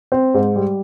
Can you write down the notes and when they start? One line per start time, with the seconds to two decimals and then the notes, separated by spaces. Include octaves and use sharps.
0.12 C4
0.34 G#2
0.56 G3